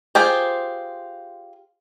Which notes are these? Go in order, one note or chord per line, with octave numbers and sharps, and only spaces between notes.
F4 G4 G#4 C5